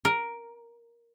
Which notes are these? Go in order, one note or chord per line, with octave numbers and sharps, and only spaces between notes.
A#4